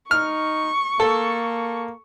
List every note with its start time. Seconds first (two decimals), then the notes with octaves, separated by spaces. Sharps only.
0.11 D#4 C#6 F6
1.00 A#3 A4